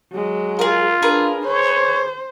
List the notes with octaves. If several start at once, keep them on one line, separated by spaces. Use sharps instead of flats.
F#3 G#3
F4 G#4 A#4
D4 G#4 A#4 B4
C5 C#5